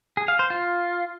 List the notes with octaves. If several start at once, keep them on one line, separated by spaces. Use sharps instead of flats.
G#4
F5
C5
F4